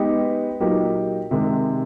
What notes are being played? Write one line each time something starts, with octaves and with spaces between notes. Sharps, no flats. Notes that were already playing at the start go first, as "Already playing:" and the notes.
Already playing: G#3 B3 D#4 G4 B4
A#2 F#3 A#3 D#4 G4
C3 D#3 G#3